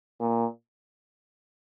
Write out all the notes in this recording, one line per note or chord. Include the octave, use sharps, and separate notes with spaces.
A#2